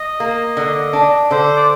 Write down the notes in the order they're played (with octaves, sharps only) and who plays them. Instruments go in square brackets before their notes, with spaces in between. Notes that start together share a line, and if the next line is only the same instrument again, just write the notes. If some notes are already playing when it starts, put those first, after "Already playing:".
Already playing: [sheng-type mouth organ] D#5
[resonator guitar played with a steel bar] A#3
D3
D4
[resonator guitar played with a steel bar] D3 [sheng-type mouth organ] C5
[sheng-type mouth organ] D5